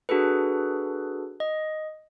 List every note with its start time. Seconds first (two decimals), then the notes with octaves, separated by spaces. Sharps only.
0.09 D4 F#4 G#4 A4 B4
1.40 D#5